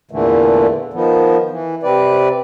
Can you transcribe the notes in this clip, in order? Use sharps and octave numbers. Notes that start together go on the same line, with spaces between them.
E2 A#2 D3 E3 A3
D#3 F3 B3
E3
C3 C4 B4 D5